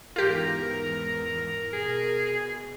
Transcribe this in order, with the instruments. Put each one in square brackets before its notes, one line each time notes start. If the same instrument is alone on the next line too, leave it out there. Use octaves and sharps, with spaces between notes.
[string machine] E2 G#2 E3 [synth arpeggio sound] F4 G4 [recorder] A#4
[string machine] B2 [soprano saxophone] G#4